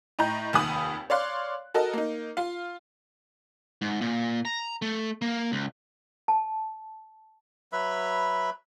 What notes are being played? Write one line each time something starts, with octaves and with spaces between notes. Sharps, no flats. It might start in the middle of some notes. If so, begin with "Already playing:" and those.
A2 D#5 G5 A#5 G6
F1 D#2 G#5 B5 D#6 F#7
C#5 D5 F5 C6 F#6
F#4 A4 A#4 D#5
A#3 D#4
F4 F5
G#2
A#2
A#5
A3
A#3
C#2
A5
F#3 B4 E5 B5